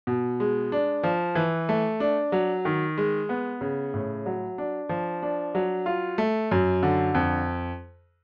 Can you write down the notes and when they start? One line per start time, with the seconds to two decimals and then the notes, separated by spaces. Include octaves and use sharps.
0.07 B2
0.40 G#3
0.72 D4
1.03 F3
1.35 E3
1.69 A3
2.00 D4
2.32 F#3
2.65 D#3
2.97 G#3
3.29 B3
3.61 C#3
3.94 A2
4.26 F#3
4.58 D4
4.89 F3
5.22 D4
5.55 F#3
5.86 F4
6.18 A3
6.51 F#2
6.83 D3
7.15 F2